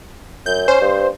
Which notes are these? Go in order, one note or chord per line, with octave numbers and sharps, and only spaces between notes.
F#2 G6
C#4 C5
G2